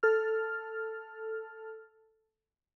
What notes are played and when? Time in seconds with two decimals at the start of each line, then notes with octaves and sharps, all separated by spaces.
0.03 A4 F6